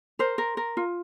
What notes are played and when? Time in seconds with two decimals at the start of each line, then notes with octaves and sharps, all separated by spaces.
0.19 A#4 C5
0.38 A#4
0.57 A#4
0.77 F4